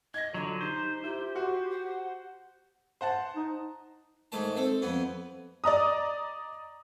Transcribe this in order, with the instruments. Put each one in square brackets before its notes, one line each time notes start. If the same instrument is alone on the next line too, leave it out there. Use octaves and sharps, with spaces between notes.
[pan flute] D#5 [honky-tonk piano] G#6 A#6
[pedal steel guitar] D3 F#3 [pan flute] F4
[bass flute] D#4 [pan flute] G4 [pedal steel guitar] C5
[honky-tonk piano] E4 [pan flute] F4 [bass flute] G4
[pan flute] F4 [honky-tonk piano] F#4
[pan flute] F#5
[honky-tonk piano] C5 F#5 A5
[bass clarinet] D#4
[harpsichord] G#2 D#3 A3 A5
C4 A4
F2 B3
[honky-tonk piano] D5 D#5 A#5 D#6